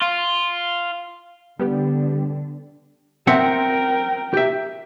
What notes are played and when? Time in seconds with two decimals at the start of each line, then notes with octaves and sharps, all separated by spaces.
0.01 F4
1.59 D3 G3 B3 G4
3.27 C4 A#4 E5 F#5 G5
4.33 G4 E5